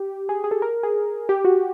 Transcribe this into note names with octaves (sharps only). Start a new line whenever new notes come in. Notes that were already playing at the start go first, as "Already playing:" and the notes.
Already playing: G4
G#4
G#4
A4
A#4
G#4
G4
F#4